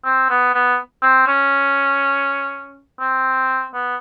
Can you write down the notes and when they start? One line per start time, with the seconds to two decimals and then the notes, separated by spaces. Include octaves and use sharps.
0.05 C4
0.30 B3
0.54 B3
1.03 C4
1.28 C#4
3.01 C4
3.74 B3